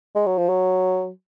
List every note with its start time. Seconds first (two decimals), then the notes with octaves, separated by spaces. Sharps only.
0.15 G#3
0.26 F#3
0.38 F3
0.49 F#3